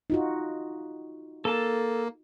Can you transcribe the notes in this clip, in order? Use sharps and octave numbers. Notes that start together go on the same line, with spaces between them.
D#4 F4 F#4
A#3 A4 A5